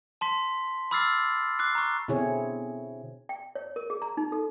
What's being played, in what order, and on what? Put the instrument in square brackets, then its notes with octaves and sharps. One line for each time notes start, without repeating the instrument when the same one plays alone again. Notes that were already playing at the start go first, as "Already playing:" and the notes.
[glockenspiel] A5 C6 B6
B5 D6 E6 F6 A6 C7
D6 F#6 C7
A#5 C#6
[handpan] B2 D3 C4 E4 G#4 C#5
[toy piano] G5
C#5
A#4
G#4
A#5
D#4
A4